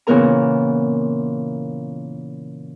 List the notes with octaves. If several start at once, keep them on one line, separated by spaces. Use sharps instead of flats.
A#2 C#3 E3 B3 A#4 A#5